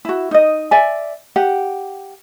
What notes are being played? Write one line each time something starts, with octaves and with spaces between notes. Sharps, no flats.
E4 F#4
D#4 D#5
D5 E5 G#5
G4 F#5